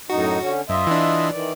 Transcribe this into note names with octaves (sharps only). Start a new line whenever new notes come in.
F#2 A2 D#4 F#4
D3 C#4
F#2 F4 D#5 E5
E3 D4
D#3 E3 D5